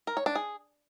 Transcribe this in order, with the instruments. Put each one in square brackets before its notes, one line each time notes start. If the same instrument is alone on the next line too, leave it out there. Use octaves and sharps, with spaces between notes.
[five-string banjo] A#4
C#5
D4
G#4